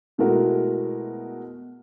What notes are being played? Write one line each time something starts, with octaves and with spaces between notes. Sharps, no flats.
B2 G#3 A3 E4 F#4 A#4